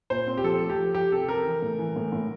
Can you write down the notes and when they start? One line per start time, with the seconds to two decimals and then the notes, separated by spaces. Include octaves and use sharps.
0.10 A#2 C5
0.27 C4
0.38 G4
0.44 F3 A4
0.61 A3
0.70 G4
0.78 F3
0.94 F3 G4
1.12 C3 A4
1.29 C4 A#4
1.45 E3
1.62 A2
1.79 E3
1.96 A2
2.12 A2